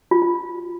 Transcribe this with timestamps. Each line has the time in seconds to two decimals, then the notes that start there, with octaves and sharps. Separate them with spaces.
0.11 F4
0.22 F4